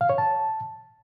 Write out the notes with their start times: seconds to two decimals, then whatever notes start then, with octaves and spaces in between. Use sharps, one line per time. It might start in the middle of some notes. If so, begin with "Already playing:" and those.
0.01 F5
0.10 C#5
0.18 A5